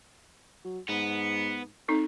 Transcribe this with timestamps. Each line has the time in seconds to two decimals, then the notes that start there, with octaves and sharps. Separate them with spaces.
0.64 F#3
0.88 G#2 B3
1.88 C4 D#4 A4